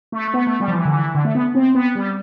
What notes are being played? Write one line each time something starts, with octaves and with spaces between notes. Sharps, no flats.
A3
A3
B3
A3
G3
F3
E3
D3
E3
D3
A3
B3
C4
B3
G3